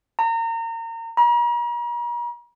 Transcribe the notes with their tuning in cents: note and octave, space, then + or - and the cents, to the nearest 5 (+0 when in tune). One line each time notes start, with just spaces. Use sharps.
A#5 -30
A#5 +45